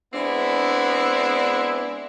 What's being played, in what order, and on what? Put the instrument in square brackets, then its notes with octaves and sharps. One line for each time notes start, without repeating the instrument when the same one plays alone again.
[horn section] G#3 B3 C4 D4 E4